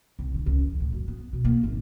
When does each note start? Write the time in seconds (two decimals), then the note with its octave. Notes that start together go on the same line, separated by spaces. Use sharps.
0.19 C2
0.34 D3
0.46 C#2
0.62 F2
0.80 A2
0.93 F#2
1.08 B3
1.33 B2
1.45 A#3
1.63 G#1